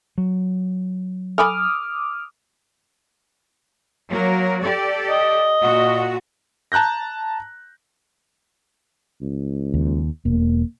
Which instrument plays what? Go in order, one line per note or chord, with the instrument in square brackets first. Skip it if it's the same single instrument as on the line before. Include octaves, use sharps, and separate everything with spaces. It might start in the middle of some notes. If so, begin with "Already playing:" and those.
[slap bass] F#3
[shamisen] A4 G#5 B5 [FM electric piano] D6 D#6 F6
[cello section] F#3 A#3 A#4
G4 A4 D5
[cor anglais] D#5
[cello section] A#2 F#4
[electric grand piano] A5 A#5 F#6 G6 A#6
[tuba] C#2
[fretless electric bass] D#2
[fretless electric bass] E1 [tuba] A#3